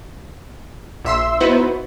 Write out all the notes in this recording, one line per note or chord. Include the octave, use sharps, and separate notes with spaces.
A#1 E5 C6 E6
B3 D#4 E4 F#4 B4 C5